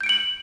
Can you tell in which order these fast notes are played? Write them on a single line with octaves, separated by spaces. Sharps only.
G6 D7 C#7 F#7